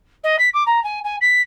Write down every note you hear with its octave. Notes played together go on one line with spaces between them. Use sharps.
D#5
B6
D6
A#5
G#5
G#5
B6